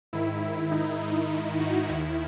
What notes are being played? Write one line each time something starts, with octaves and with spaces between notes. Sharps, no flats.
G#2 D#3 E4
E4
D#4
E4
E4
D#4 F#4
D#2 D#3 E4